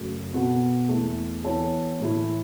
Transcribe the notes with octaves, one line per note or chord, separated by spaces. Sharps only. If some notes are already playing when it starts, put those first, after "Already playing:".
Already playing: F#2 C#3 A3
B2 B3 F#4 A4
E2 E3 A3
E3 B3 A4 C#5
A2 E3 A3 E4 A4